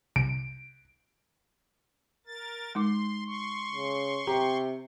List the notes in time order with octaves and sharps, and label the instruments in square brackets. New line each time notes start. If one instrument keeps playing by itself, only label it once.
[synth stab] C2 [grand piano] D7
[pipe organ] A#4 A6
[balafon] G#3 D#4 D6 [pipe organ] C6
[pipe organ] C6 C#6
[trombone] C#3
[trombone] C3 [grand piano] G4 [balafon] A#5